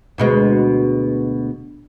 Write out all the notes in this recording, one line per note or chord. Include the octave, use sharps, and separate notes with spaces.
D2 B2 G#3